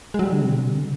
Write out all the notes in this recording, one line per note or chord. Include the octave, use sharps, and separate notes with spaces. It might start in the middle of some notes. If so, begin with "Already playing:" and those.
G#3
F#3
G3
D3
C3
B2
C3
D3